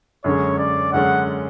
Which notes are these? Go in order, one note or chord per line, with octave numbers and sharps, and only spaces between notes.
F#2 D3 G#3 C#4 C#5
D5
F#2 D3 G#3 C#4 F#5